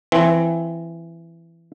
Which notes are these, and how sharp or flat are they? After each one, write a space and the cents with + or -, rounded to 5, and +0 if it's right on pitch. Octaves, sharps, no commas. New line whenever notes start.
E3 +20 C4 +0